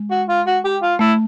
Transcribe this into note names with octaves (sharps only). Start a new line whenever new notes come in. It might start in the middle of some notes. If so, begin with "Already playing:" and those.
Already playing: G#3
F#4
F4
F#4
G4
F4
A3 E4